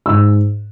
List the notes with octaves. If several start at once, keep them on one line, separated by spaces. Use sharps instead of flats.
G#2 E6